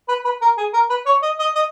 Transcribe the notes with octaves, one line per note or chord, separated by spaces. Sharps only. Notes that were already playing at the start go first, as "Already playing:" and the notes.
B4
B4
A#4
G#4
A#4
B4
C#5
D#5
D#5
D#5